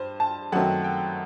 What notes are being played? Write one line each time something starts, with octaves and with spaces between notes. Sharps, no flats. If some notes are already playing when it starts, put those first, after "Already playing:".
Already playing: G2 C5
A5
F#2 D#3 F#3 A3 C4 F#5
G5